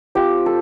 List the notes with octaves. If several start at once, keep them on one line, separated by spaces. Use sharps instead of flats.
F3 C4 F4 G4
A4